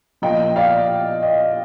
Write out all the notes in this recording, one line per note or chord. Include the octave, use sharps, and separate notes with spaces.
A#2 F3 D#5 G5
D5 F5
D#5